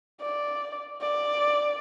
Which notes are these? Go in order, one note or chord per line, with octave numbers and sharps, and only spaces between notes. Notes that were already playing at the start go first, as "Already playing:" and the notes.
D5
D5